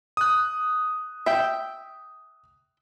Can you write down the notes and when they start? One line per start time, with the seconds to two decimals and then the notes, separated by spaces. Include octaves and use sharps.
0.17 D#6 F#6
1.26 E5 G5